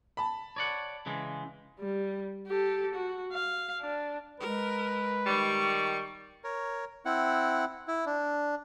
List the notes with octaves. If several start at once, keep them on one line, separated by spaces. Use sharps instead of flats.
A5 B5
C#5 D5 F#5
C#3 E3 G#3
G3
G4 A4
F#4
F5
D4
G#3 A#4 B4
D#3 G3 C#6
A#4 C#5
C4 E4 F#5
E4
D4